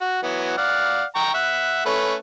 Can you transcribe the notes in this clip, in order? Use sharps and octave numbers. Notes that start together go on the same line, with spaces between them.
F#4
E3 F#3 B3
D5 F5 F#5
G5 A#5 C#6
E5 F#5
A3 C#4 B4